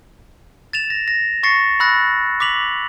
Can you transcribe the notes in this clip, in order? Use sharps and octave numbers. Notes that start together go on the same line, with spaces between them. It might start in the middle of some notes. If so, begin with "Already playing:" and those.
A6 E7 F7
A#6
A#6
C#6 A6 A#6 C7 C#7
B5 E6 F#6 A6 A#6
D6 B6 F7 F#7